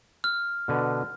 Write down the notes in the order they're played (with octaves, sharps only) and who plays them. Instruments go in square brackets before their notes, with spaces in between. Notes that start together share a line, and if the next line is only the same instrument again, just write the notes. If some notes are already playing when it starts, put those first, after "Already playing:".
[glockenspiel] F6
[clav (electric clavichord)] B2 D3 B4